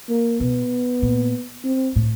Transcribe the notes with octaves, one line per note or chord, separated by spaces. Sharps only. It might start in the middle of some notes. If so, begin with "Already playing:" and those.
A#3
B2 B3
A#2
C4
A2